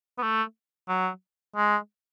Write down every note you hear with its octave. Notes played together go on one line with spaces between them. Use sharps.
B3
A3
F#3
G#3